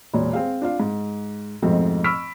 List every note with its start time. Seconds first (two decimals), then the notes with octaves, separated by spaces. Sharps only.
0.14 E1 A#2
0.33 C4 G#4 F5
0.62 D4 F4 F5
0.80 G#2
1.62 F2 G#2 B2 F3 A3 C4
2.04 B5 C#6 E6 F6 B6 D7